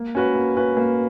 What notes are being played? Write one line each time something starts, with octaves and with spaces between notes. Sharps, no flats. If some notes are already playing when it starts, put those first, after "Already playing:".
Already playing: A#3
C#4 F#4 B4
A#3
C#4 F#4 B4
A#3